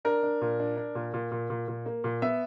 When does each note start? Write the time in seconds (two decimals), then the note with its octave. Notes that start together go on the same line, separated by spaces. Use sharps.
0.05 D4 A#4
0.23 D4
0.41 A#2
0.59 D4
0.77 D4
0.95 A#2
1.14 A#2
1.32 A#2
1.50 A#2
1.68 A#2
1.86 A#3
2.04 A#2
2.22 B3 E5